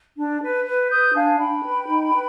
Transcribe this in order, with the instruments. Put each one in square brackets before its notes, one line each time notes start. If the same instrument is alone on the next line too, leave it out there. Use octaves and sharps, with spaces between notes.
[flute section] D4
B4
B4
B4 D#6 G6
D4 F5 G#5
D4 G5 B5
B4
D#4
B4